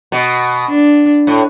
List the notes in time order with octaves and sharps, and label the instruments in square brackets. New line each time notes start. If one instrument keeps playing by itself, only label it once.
[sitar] B2
[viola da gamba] D4
[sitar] A2